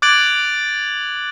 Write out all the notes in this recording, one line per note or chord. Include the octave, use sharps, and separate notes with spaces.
D6 F#6 G#6 A6 D7 F#7